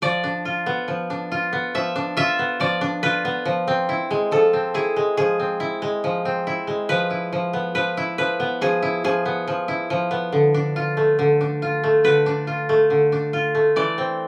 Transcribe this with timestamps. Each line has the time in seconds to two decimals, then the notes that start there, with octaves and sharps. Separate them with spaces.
0.02 F3 D5
0.24 D4
0.45 F4
0.66 B3
0.88 F3
1.10 D4
1.32 F4
1.53 B3
1.75 F3 E5
1.96 D4
2.17 F4 E5
2.39 B3
2.60 F3 D5
2.81 D4
3.03 F4 B4
3.25 B3
3.45 F3
3.68 C4
3.89 E4
4.11 G#3
4.31 F3 A4
4.53 C4
4.74 E4 G#4
4.96 G#3
5.17 F3 G#4
5.39 C4
5.60 E4
5.82 G#3
6.04 F3
6.25 C4
6.47 E4
6.67 G#3
6.89 F3 B4
7.10 E4
7.33 F3
7.53 B3
7.75 F3 B4
7.97 E4
8.18 F3 B4
8.40 B3
8.61 F3 G#4
8.82 E4
9.04 F3 G#4
9.25 B3
9.48 F3
9.68 E4
9.90 F3
10.11 B3
10.33 D3
10.54 D4
10.76 F4
10.97 A3
11.19 D3
11.41 D4
11.62 F4
11.84 A3
12.04 D3 B4
12.26 D4
12.47 F4
12.69 A3
12.90 D3
13.12 D4
13.33 F4
13.55 A3
13.76 E3 D5
13.98 C4